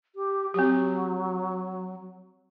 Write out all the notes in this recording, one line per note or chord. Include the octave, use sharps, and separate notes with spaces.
G4
F#3 C4 G4